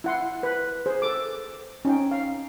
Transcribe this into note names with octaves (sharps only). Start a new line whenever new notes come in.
E4 F#5 C6
B4
G#4 C5
A4 D6
C#4 D#4 G5
F5